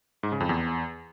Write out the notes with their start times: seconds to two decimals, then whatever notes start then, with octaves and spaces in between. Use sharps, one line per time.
0.23 G#2
0.32 C#3
0.40 F2
0.49 E2